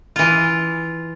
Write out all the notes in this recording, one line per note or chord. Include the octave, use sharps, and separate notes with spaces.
E3 F4